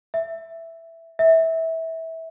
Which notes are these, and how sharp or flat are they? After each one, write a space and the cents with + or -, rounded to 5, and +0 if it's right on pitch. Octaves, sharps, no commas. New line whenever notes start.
E5 +5
E5 -20